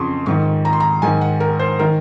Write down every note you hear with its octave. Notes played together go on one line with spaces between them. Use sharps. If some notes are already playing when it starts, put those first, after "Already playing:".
Already playing: F2 C#3 C6 C#6
G#2 D#3 C#6
A#5
C6
A#5
G#2 D#3 G#5
F#5
A#4
C5
D#3 A#4